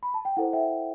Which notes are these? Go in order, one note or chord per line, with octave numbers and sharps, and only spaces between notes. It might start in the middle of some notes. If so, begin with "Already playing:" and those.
B5
A5
G5
E4 A4 C5 F#5
E5 G5